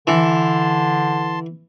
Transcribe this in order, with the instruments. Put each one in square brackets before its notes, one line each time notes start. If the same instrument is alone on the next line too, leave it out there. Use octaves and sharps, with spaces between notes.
[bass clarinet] D3 [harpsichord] E3 [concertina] A5 C6